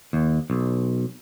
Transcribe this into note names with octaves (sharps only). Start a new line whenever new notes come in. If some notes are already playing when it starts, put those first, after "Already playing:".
D#2
B1